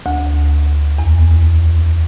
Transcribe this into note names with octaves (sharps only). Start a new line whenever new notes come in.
D2
E2